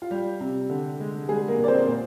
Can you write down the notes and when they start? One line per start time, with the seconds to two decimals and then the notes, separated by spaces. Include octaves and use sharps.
0.02 F4
0.11 G3 G4
0.40 C3
0.70 D3
1.00 G#3
1.29 G3 G#3 G#4
1.48 A#3 A#4
1.58 A#2
1.64 D5
1.68 C4 C5
1.88 A#2